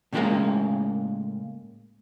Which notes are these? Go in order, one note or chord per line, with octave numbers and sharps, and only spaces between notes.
A2 C#3 F3 G3 G#3 A#3